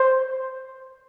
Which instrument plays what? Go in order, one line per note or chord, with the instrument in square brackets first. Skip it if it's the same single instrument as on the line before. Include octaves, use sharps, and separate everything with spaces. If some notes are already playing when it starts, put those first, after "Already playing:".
Already playing: [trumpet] C5